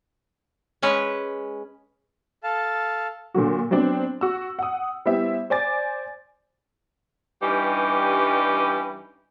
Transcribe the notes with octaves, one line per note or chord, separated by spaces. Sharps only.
G#3 C#4 B4 C#5
A4 F5 A5
A#2 D3 F#3 F#4
F#3 B3 C4 D4
F#4 E6
F#5 D#6
G3 B3 E4 C5 E5
C5 D5 G#5 D6 A6
G2 E3 G3 C#4 D#4 G4